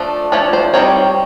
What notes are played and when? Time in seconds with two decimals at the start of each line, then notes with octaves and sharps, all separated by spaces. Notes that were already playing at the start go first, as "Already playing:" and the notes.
Already playing: F3 A3 D4
0.32 F3 A3 D4 C#5
0.53 C5
0.74 D#3 G3 C4 C#5